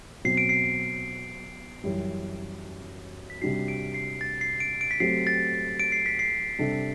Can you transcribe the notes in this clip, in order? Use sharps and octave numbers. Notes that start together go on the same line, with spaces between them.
B2 F#3 C4 C7
D7
C7
F#2 E3 G3
B6
C3 G3 D4 F#4 C7
D7
C7
A6
C7
D7
D7
B6
F#3 A3 C4 G4 C7
A6
D7
C7
B6
C7
C3 G3 D4 A4